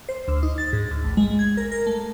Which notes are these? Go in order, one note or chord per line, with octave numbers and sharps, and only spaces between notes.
C5
D2
D#4
A6
G#2
D2
A1
G#3
G#6
A#4
A#4
A3